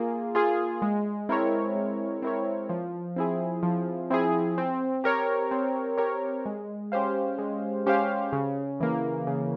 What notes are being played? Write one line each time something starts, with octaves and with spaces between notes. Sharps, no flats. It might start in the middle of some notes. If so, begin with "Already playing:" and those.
Already playing: A#3 F4 G#4
F4 G#4
G#3
C4 E4 A#4 C#5
G#3
C4 E4 A#4 C#5
F3
C4 E4 G#4
F3
C4 E4 G#4
C4
G4 A#4 C#5
C4
G4 A#4 C#5
G#3
C#4 G4 C5 F5
G#3
C#4 G4 C5 F5
C#3
E3 A#3
C#3